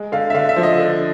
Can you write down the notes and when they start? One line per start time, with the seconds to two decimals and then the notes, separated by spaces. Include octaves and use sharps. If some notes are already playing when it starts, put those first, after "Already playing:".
Already playing: G#3
0.12 D3 F5
0.30 E5
0.34 D3 F5
0.49 E5
0.56 F3
0.63 D#5
0.78 D3